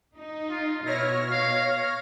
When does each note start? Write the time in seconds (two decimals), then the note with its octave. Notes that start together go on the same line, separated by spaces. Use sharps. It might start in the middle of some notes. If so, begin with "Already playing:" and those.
0.17 D#4
0.51 F4
0.86 B2 E4 C#5 F6 A#6
1.31 F5